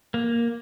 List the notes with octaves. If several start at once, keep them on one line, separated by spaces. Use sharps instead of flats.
A#3